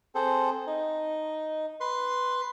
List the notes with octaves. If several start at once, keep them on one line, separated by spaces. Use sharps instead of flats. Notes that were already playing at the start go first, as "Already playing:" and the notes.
C4 G#4 A4 C5
D#4
B4 C6